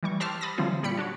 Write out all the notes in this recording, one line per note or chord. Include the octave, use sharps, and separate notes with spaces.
E3 G3 C#6
G4 C5 A5 E6 F6
B5 D#6 A6 A#6
D3 E3 F#3 G3 C4 F4
A#2 G3 G4 B5 C#7
D4 F#4 C#5